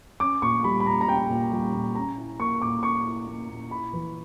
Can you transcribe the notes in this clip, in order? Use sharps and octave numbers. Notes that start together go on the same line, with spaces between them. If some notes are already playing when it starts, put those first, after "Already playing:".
C#4 D6
A#2 C#6
G3 B5
B5
A#2 A#5
A#5
C#4 G5
A#2
G3
A#2
C#4 A#5
E4
A#3 C#6
A#2 D6
C#4 C#6
E4
A#3
A#2
E4 B5
E3